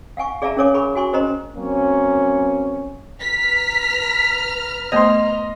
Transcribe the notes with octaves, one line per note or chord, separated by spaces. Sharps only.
F5 F#5 G#5 C#6
G#4 D5 E5 F5 A5 A#5
C#4 G#4 A#4 C#5 G#5 D6
G#4 A#4 G#5 A#5 B5 C#6
F#4 G#5 C6 C#6
C#4 A#4 C5 D#5 A#5 C6
F#3 A#3 C4 C#4
B4 A#5 F6 B6
A3 B3 C5 D#5 C6